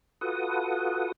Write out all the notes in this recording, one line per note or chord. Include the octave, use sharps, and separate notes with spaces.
F4 F#4 A4 B4 F#5 D#6